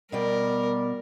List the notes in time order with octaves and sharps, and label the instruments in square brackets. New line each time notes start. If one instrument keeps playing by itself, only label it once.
[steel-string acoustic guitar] B2 D5 G5 [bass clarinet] G3 [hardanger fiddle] A#4